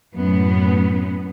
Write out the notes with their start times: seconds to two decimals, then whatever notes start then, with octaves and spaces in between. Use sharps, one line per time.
0.16 F#2 A2 B3